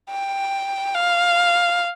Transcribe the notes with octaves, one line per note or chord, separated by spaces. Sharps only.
G5
F5